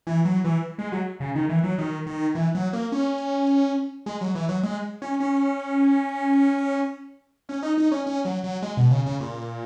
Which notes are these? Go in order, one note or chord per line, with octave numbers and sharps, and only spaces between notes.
E3
F#3
E3
G#3
F#3
C#3
D#3
E3
F#3
D#3
D#3
E3
F#3
A#3
C#4
G#3
F#3
E3
F#3
G#3
C#4
C#4
C#4
D#4
D#4
C#4
C#4
F#3
F#3
G#3
B2
C#3
C#3
A#2